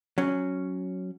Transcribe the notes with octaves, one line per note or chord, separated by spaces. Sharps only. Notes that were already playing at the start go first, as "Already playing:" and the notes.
F#3 C#4